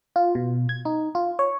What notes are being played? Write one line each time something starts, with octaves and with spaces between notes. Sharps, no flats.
F4
B2
G#6
D#4
F4
C#5